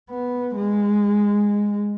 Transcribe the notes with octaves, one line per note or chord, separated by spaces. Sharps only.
B3
G#3